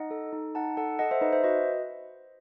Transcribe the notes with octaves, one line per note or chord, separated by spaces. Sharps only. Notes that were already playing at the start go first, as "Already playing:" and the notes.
Already playing: D#4 D#5 F#5
A4
D#4
D#4 F#5 A5
A4 F#5 A5
A4 D#5 F#5
C5 E5
D#4 B4 D#5
C5 E5
F#4 B4 D#5